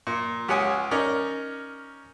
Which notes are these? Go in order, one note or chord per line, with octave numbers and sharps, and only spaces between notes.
A#2
C#2 G4 C#5 F#5 G#5 D#6
C#4 D#4 A#4 D5